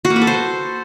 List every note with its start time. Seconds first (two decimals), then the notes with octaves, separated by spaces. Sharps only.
0.05 F#4
0.10 A#3
0.16 B4
0.22 A4
0.27 C5